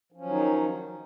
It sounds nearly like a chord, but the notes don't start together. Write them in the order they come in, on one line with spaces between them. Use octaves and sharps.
F3 C#4 F#3 D#3 D#4